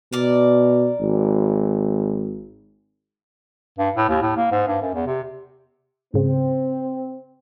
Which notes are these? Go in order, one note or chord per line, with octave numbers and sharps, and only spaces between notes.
B2 A#4 D5
G#1
G2
A2
D#2
A2
A#3
G#2
G2
F#2
E2
C3
G#2 C#3 C4